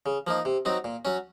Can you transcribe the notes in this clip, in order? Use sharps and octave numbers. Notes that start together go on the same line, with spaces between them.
C#3
F3 A#3 D#4
C3
F#3 C4 D#4
A#2
F#3 C#4